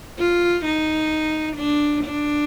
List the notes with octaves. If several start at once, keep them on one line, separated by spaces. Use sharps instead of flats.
F4
D#4
D4
D4